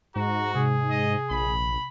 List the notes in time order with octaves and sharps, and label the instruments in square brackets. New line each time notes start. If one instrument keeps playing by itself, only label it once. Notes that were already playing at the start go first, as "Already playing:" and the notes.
[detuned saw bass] G#2 [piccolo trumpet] F#4 [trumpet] A#5
[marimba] C3 [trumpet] G#4
[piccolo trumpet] D#5
[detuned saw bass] A#1 [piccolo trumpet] B5